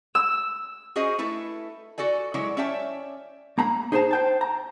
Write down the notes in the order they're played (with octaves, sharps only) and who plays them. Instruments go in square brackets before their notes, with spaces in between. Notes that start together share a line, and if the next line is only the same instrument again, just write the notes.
[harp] E6
[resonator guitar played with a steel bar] C#4 F#4 G#4 C5 D#5 G#5
A3 E4 A4 B4
F#4 A4 D5 G#5
F#3 G#3 E4 C#5 D5
C#4 C#5 D5 E5 G5 A5
[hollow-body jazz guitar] A#3 A#5 B5
D#4 G#4 C5 G5 A5 A#5
C5 G5 A5
A#5